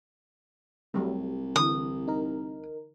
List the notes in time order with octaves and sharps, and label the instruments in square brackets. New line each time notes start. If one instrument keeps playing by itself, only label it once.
[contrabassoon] C2 [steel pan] F#3 G3 A3
[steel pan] D3 E3 [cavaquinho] D#6
[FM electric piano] D#4 A#4